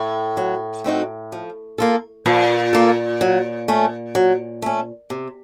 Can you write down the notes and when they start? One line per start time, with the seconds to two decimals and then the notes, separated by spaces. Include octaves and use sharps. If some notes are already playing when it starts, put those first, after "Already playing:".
Already playing: A2
0.37 F#3
0.84 A3 C4 D#4 F#4
1.32 F3
1.78 A#3 F4 A4
2.26 A#2 F3
2.73 A#3 F4 A4
3.21 F#3
3.68 A3 C#4
4.15 F#3
4.62 A3 C#4
5.10 C3